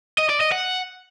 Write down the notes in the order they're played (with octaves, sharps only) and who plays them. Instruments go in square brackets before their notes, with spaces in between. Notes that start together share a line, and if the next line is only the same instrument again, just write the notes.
[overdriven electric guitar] D#5
D5
D#5
F#5